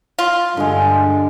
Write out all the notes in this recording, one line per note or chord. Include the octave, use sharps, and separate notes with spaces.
F4
G2 D3 G#3